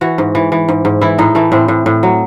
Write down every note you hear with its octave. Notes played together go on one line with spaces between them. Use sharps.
E3 F#4
G#2
E3
E3
G#2
G#2
E3 E4
A2 D#4
E3 A3
A2 C4
A2
A2
F#3